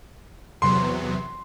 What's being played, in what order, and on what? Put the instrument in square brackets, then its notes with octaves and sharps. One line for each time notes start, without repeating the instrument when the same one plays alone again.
[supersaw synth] E2 C3 F#3 B3 [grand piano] C6